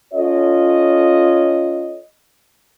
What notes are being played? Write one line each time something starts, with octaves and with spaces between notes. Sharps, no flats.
C#4 F4 A4 C#5 D#5